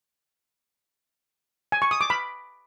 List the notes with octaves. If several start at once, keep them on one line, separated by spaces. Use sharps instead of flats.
G#5
C#6
D#6
D6
B5